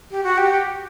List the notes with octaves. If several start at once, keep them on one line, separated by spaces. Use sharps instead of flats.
G4
F#4
G4